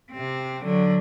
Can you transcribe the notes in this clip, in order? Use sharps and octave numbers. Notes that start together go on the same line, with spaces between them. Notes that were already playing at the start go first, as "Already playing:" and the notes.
C3 C4
D3 F#3